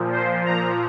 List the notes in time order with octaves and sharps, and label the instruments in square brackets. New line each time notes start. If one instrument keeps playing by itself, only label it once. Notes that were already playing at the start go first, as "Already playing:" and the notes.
Already playing: [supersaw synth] A#2 F3
C5
A#2 F3 A#5